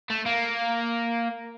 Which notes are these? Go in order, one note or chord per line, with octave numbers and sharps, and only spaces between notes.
A3
A#3